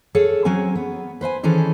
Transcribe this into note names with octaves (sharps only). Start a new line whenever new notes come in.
G#4 A4 C#5 F5
F#3 C4 C#4 G#5
B3
B4 C5 E5 G#5
D#3 E3 C#4 G#4 A4 C5